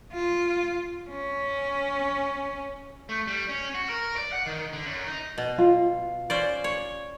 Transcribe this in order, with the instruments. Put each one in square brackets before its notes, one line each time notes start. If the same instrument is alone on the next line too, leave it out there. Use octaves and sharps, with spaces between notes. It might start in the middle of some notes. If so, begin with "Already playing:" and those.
[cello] F4
C#4
[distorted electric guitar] A3
G3
C#4
F#4
A#4
D5
F#5
D#3
D3
F#2
D#4
[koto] B2
[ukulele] F4
[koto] C#4 C5 D5
C#5